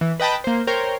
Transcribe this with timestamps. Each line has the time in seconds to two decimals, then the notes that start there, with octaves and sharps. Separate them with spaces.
0.01 E3
0.20 B4 D#5 G5 A5 B5
0.44 A#3 C5
0.67 A#4 C5 C#5 G5